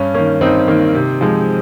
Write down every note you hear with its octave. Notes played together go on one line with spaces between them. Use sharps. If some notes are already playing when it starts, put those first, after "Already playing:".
Already playing: G2 C#4
D#3 A#3 C#4
G2 C4 D#4
D#3 A#3
C3
F3 G#3